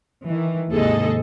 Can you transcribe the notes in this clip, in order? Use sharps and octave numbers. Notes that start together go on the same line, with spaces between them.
D#3 E3
D#2 G#2 C3 G#4 A4 D#5